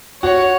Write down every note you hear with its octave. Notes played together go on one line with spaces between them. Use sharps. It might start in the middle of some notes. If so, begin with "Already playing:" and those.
F#4 C#5